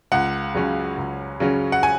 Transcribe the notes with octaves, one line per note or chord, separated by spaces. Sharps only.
C#2 F#5
C#3 F#3 C#4
C#2
C#3 F#3 C#4
F#5
G#5